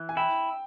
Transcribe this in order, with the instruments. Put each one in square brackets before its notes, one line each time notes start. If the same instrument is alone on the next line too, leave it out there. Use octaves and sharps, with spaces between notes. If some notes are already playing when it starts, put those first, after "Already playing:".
Already playing: [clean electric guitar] E3
[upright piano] G#5
[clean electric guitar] E4 [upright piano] G5